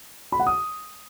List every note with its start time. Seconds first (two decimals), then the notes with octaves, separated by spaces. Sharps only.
0.32 B5
0.39 F#5
0.47 D#6